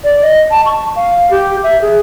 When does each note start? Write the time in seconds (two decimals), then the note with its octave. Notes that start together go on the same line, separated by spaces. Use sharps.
0.04 D5
0.22 D#5
0.51 A5
0.66 C#6
0.96 F5
1.31 G4
1.63 E5
1.82 G#4